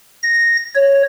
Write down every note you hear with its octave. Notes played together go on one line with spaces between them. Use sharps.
A#6
C#5